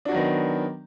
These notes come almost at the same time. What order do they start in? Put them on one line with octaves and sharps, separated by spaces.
D4 F#4 F#3 D#3 B3